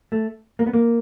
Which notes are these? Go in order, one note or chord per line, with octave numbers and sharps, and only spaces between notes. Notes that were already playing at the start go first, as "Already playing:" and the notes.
A3
A#3
B3
A#3